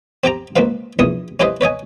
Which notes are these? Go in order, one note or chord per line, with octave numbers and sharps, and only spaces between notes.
C4 G4 G5 A#5
C#2 A#3 C4 B4 F5
A#1 E2 E4 D#6
C#4 E4 G4 B4 C5 D#5
B4 C#5 D#5 G#5